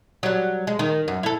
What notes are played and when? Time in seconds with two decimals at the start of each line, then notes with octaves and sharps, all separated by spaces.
0.23 F#3 G3
0.67 G#3
0.79 D#3
1.08 F#2
1.23 E4 A4